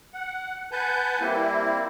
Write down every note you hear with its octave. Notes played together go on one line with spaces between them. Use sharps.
F#5
B4 F#5 G#5 A5 G6
G3 A#3 C4 E4